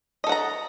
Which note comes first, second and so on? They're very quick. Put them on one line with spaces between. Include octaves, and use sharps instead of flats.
D#5 A4 F#5 A#5